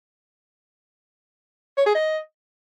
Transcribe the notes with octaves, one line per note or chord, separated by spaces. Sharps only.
C#5
G#4
D#5